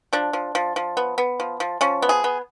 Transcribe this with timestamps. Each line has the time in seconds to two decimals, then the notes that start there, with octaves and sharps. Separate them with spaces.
0.13 F3 D4
0.33 F3
0.55 F3
0.76 F3
0.97 B3
1.18 B3
1.40 F3
1.60 F3
1.81 F3 C#4
2.02 B3
2.09 G#4
2.24 B3